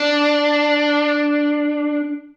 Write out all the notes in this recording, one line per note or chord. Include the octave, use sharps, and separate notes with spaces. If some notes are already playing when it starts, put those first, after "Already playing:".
Already playing: D4